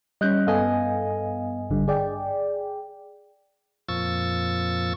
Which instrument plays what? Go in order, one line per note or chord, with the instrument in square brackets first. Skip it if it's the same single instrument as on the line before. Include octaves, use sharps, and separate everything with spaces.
[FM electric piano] G3 C#4 [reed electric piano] D#5 F#6 G6
[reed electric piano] G2 D#5 G#5 [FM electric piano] B3 A4 F5
[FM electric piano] G#1 D3 G3
G#4 D5 G5
[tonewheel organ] F2 A#2 F3 C#6 E6 A6